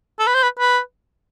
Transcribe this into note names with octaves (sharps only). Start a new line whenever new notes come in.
A4
B4
C5
B4
B4